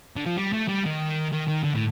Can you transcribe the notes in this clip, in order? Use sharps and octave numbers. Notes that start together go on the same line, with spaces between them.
D3
F3
G3
A3
G3
D#3
D#3
D#3
D3
A2